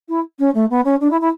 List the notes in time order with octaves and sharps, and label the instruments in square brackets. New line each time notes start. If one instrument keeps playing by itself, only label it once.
[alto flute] E4
C#4
A3
B3
C#4
D4
E4
E4